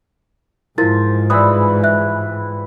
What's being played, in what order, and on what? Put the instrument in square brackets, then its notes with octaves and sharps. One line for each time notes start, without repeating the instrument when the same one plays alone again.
[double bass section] G#2 [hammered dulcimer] F3 [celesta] E4 A#4 A6
[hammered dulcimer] E3 G3 B4 [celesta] D#6 E6
[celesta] E5 F#6